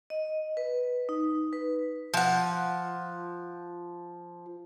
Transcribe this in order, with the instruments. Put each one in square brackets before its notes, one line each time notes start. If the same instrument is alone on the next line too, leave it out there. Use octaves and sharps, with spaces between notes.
[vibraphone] D#5
B4
D#4
B4
[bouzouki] F3 F#5